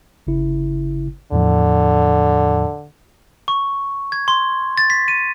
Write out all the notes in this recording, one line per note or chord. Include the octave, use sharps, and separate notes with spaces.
G1 C#3 E4
E2 A2 D3 F3
C#6
G#6
C6
A6
B6
D#7